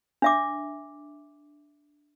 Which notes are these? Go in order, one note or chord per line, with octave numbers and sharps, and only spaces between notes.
D4 E5 D6